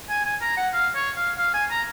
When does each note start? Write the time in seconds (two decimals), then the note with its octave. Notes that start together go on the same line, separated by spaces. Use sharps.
0.10 G#5
0.25 G#5
0.41 A#5
0.57 F#5
0.73 F5
0.95 C#5
1.16 F5
1.38 F5
1.54 G#5
1.71 A#5